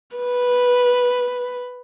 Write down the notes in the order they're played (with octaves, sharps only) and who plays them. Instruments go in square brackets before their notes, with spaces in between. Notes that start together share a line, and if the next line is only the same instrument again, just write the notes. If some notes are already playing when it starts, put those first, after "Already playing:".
[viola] B4